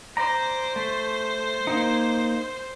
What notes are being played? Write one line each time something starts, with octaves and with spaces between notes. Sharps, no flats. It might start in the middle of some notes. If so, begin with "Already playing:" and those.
C5 D5 A#5
A3
A#3 D#4